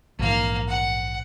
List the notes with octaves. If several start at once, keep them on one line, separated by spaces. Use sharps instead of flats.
A#1 G#2 E3 A#3 F5
F#5